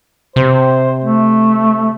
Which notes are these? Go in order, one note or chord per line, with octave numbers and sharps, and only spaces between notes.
C3 C5
A3